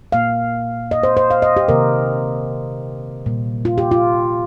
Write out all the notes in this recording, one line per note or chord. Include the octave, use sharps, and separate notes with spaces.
A#2 A#3 F5
D#5
C5
C5
F5
D#5
G4
C3 D#3 A#3 A#4
A#2 G3 A#3
F4
G4
F4